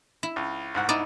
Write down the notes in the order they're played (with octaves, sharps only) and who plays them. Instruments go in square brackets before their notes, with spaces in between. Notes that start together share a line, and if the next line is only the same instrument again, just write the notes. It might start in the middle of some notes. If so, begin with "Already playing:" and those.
[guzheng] E4
[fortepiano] C#2
C2 G#2 F#5
[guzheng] D#4 E4 D5